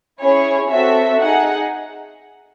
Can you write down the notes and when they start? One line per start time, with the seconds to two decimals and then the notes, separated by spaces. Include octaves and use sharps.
0.20 C#4 E4 G#4 C#5
0.70 C4 F#4 A4 E5
1.19 D#4 G#4 F#5